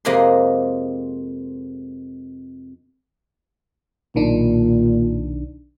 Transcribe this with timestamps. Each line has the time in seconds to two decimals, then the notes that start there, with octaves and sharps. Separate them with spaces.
0.05 F2 C3 G#3 A#3 G#4 C6
4.15 B1 A#2 D#3 D4